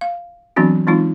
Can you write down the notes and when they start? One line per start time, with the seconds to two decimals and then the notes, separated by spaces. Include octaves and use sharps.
0.01 F5
0.56 E3 F#3 B3 C4 D4 F#4
0.87 E3 G#3 C4 D#4 F4